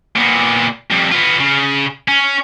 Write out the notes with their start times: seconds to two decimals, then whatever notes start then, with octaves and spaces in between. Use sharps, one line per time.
0.16 A#2 B3
0.90 F2 G3
1.12 B3 F4
1.40 C#3
2.08 C#4